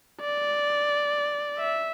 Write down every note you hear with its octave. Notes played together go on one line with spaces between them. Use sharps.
D5
E5